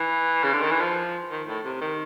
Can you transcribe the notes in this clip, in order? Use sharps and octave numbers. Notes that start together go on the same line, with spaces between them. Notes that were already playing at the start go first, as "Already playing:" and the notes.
Already playing: E3
C#3
D3
D#3
E3
F3
D#3
A2
C3
D#3